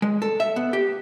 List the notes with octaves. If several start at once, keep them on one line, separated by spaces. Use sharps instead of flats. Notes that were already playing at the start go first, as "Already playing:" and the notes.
G#3
A4
E5
B3
G4